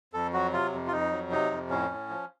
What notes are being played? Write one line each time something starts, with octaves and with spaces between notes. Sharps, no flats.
F2 A4
F#3 F#4
C3 F4
F2
F4
F2 D#4
F#3
C3 D#4
F2
A2 C#4
A2
F3